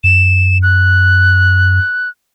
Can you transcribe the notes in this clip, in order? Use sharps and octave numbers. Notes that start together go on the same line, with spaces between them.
F#2 E7
F#6